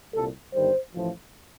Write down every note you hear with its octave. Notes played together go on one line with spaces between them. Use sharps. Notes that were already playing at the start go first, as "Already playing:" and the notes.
C2 A#2 G3 A4
G1 G2 D#3 G3 C5
A1 A2 F3